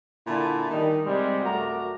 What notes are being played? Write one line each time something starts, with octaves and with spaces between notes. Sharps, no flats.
A#2 D3 E4 G#5 A5 B5
D#3 G3 D#4
C3 G3 G#3
F#2 A3 F#4 A#4 D5 A#5